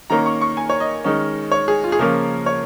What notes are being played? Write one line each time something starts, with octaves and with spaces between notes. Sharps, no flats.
D#3 A#3 C#4 A#5
C#6
C#6
G#5
C#5
D#5
D#3 G#3 C#4
C#5
G#4
F4
G#4
C#3 F3 A#3 C#4 A#4
C#5